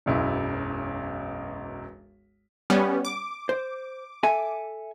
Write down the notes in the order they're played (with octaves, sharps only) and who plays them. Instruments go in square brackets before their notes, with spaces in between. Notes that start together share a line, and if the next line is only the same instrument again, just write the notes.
[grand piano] E1 B1 F#2 E4
[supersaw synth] G3 B3 C#4
D6
[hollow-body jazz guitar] C5
A4 E5 G#5